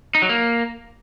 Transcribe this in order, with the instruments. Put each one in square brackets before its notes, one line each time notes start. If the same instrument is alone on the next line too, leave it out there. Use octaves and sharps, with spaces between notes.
[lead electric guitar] D#4
F#3
A#3